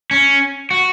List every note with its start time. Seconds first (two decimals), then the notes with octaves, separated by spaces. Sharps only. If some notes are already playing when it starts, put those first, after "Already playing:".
0.11 C#4
0.71 F#4